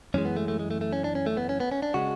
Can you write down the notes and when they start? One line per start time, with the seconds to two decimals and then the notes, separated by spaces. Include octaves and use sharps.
0.14 F#2 E3 G#3 C#4
0.25 B3
0.36 A3
0.48 A3
0.59 G#3
0.71 A3
0.81 A3
0.93 C#4
1.04 D4
1.15 C#4
1.26 A3
1.37 B3
1.49 C#4
1.60 B3
1.72 C#4
1.82 D4
1.94 C#3 G#3 F#4